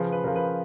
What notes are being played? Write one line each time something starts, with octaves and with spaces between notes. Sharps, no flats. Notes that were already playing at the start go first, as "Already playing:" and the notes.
Already playing: C#3 F3 B4
B4
C#3 F3 A#4
B4